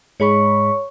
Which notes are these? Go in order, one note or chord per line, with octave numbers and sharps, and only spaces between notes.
G#2 G#3 C#5 B5 C#6